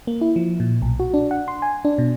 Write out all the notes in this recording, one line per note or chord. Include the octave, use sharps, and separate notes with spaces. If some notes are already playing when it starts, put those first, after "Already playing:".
A#3
E4
F3
A#2
B1
F#4
D4
F#5
C6
G#5
D4
B2